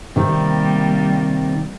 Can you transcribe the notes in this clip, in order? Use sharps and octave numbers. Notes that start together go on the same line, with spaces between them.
C3 D#3 G3 A#3